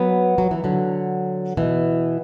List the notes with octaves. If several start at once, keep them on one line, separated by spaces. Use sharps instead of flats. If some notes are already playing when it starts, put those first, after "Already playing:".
Already playing: F#3 B3
F#3
E3
D3 F#3
B2 E3